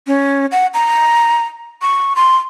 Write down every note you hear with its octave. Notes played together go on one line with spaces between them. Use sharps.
C#4
F#5
A#5
C#6
C6